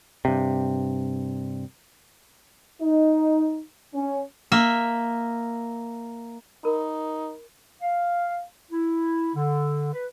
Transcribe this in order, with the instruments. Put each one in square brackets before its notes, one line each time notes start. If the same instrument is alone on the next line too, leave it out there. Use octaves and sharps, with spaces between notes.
[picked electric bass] G2 C3
[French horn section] D#4
C#4
[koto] A#3 E5
[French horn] D#4 [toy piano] A#4 B5
[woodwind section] F5
E4
D3
B4